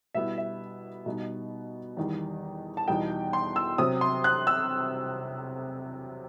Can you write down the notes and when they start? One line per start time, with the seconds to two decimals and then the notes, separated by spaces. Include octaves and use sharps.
0.15 B2 G3 B3 E4 E5
0.38 E5
1.06 B2 G3 D#4
1.97 E2 D#3 G3
2.77 A5
2.88 E2 B2 G3 D#4 G5
3.33 C6
3.56 E6
3.78 C3 F#3 C4 D#6
4.01 C6
4.24 F#6
4.47 E6